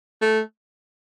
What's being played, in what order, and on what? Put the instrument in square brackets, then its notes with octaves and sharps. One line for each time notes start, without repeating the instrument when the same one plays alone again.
[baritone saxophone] A3